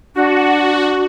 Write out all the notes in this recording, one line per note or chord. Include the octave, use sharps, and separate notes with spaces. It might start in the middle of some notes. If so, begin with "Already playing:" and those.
D4 F#4